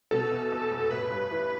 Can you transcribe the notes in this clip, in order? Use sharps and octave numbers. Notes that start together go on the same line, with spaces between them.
B2 A4
E2
E2
F1
A1 B4
G2
E3